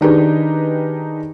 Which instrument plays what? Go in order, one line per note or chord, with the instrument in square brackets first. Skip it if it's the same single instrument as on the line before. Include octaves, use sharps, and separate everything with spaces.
[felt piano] D#3 D4 D#4 G4 G#4 B4